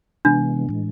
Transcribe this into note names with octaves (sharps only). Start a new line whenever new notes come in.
C3 E3 G#3 B3 D4
A2 E3 G#3